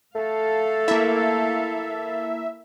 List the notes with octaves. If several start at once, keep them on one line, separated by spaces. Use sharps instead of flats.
A3 A4 F5
A#3 E4 E5